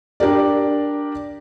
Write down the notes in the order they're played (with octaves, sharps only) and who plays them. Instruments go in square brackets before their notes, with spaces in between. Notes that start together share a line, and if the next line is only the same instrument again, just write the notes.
[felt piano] D4 G4 A#4 D5